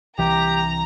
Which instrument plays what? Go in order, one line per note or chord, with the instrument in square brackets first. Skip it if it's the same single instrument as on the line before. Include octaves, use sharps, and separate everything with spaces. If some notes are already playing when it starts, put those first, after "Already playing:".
[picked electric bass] C2 E3 [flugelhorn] G4 [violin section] A#5